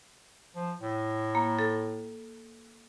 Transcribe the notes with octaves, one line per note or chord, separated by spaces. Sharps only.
F3
A2
A#3
A4